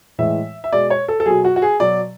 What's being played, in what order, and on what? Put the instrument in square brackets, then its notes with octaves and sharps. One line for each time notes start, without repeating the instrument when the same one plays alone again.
[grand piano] A2 E3 G#3 E5
E5
B2 G#3 D5
C#5
A4
A4
B2 F#3 G#4
F#4
F#4
G#4
B2 F#3 D5